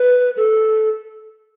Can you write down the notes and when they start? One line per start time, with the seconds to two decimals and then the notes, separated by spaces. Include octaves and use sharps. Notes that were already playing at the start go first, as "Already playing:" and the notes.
Already playing: B4
0.37 A4